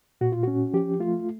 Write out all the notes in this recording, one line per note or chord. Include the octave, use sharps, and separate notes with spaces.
A#2 F#4
F4
C#4 F#4
F3 G4
A3 F4